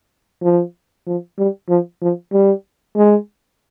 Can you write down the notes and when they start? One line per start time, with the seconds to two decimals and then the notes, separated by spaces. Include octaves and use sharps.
0.42 F3
1.07 F3
1.39 G3
1.69 F3
2.02 F3
2.33 G3
2.96 G#3